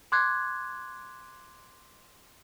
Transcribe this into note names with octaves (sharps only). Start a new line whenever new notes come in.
C6 D6 F#6 G#6